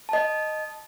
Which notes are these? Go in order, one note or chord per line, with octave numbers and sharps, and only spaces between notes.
D#5 A5